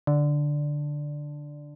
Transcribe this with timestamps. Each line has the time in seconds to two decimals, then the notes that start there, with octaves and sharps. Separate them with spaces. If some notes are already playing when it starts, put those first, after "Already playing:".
0.07 D3